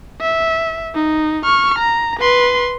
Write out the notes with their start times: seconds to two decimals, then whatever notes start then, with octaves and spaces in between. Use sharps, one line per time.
0.21 E5
0.95 D#4
1.44 C#6 F6
1.79 A#5
2.19 B4 C6